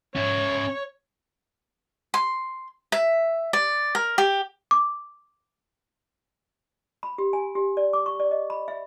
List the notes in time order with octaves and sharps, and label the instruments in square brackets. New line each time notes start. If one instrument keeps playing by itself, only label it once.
[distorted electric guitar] C#4 E5 [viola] C#5
[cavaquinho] C6
E5
D5
A#4
G4
[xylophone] D6
[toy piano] B5
G4
G#5
G4
D5
D6
C#6
D5
D#5
B5
E5